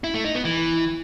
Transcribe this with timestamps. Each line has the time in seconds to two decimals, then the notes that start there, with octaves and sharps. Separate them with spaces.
0.04 E4
0.14 A3
0.24 D#4
0.35 B3
0.45 E3